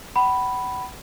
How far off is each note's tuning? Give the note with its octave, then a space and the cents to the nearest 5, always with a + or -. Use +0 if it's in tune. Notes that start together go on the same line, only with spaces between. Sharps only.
F#5 +40 B5 +0